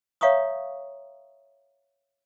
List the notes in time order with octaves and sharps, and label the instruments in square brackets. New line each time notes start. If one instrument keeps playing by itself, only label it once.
[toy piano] C#5 E5 F5 A#5 C#6 D#6